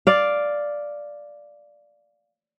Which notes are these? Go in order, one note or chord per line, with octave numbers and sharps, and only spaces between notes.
D5 F5